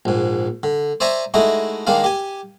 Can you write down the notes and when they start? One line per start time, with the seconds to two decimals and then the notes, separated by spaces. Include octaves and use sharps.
0.05 A#1 G#2
0.63 D3
1.00 C5 D5 E5 G#5 A#5 C#6
1.34 G#3 A3 D#4 E4 F#4
1.87 D#3 G#3 A#3 D4 F5
2.04 G4 G#5